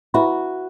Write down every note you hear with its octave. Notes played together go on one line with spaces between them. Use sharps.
E4 F#4 B4 E5 B5